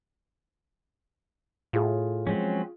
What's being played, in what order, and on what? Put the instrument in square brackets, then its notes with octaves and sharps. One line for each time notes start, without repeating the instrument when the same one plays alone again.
[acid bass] A2 [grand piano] F4 G#4
[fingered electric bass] F3 G#3 [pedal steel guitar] F#3 C4 C#4